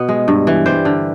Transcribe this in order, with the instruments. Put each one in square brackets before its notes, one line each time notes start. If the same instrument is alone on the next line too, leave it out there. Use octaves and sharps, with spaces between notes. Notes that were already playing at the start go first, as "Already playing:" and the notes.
Already playing: [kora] B2 B3
G#3
G2
E3
G3 C5
D3